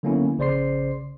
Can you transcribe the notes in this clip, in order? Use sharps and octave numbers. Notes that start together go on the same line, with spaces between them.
D3 F#3 A#3 B3 C#4 E4
A#1 C#3 C5 D5 C6 C7